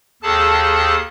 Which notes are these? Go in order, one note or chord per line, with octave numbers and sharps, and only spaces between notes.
D#2 G#4 A4 A5